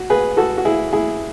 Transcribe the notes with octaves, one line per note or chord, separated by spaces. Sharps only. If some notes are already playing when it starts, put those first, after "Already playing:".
Already playing: F#4
G#4 B4
F#4 A4
F#4
E4 G#4
E4 G#4